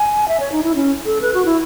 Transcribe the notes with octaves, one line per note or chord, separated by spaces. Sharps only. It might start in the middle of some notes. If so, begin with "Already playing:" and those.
Already playing: G#5
E5
C#5
D#4
E4
C#4
A4
B4
F#4
E4